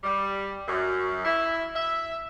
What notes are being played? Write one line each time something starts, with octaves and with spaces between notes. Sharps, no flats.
G3
F#2
E4
E5